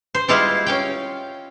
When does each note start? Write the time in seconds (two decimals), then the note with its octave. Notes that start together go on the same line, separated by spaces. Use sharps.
0.15 C5
0.28 G3 G#3 E4 F4 D#5 F5
0.66 C#4 F5 G5